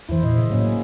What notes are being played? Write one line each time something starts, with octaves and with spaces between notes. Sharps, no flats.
E2 E3 E4 C5
A#2 D#5
C#3
A2 F#3 A#3 C#4